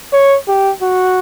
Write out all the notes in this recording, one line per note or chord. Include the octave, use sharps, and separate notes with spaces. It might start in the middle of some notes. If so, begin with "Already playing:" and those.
C#5
G4
F#4